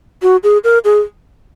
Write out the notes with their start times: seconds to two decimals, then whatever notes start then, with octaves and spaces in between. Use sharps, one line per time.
0.22 F#4
0.43 G#4
0.64 A#4
0.85 G#4